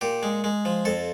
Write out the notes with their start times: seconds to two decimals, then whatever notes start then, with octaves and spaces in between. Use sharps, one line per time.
0.01 A#2 G4
0.23 G#3
0.44 G#3
0.65 F3
0.85 F2 A4